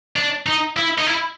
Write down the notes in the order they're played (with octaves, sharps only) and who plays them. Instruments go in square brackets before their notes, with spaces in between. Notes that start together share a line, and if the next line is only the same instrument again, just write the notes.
[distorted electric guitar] D4
D#4
E4
D#4
E4